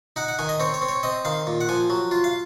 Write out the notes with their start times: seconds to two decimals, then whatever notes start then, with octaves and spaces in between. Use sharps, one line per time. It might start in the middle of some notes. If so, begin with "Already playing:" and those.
0.16 D#4 F#5
0.28 F#5
0.39 D#3 G#5
0.49 D#5
0.60 C4 C#5
0.74 C#5
0.82 C4
0.89 C#5
1.03 C4 D#5
1.25 D#3 F5
1.47 A#2
1.61 F#5
1.69 F3 G#5
1.90 F#3
2.11 F4
2.24 F5